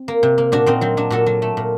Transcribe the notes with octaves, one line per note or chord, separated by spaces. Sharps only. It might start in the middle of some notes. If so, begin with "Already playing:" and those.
Already playing: C4
A#3
C3
A#3
A#2 D4 F#4
A#2 C4 D#4
F#3 C4
F#3 D4
A#2 F#4 A4
F#3
A3
A#2